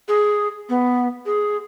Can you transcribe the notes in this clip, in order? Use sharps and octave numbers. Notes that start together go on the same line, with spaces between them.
G#4
B3
G#4